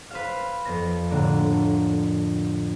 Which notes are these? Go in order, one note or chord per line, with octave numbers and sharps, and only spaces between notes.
B4 C5 F5
F2 B3 A#6
A2 D3 A#3